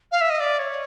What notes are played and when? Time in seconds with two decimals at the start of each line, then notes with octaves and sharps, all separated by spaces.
0.12 F5
0.21 E5
0.30 D#5
0.40 D5
0.59 C#5